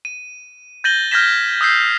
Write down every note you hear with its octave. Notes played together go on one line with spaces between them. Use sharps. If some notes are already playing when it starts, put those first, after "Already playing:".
D#7
G6 A6 A#6 D#7 F#7 G7
F6 G6 G#6 A#6 B6 E7
D#6 E6 G6 B6 C7